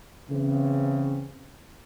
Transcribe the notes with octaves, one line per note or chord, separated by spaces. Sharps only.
C#3 E3 C4